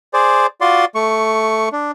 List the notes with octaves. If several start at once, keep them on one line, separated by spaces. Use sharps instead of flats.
G#4 C5 D5
F4 F#4 D5 C6
A3 C#6
D4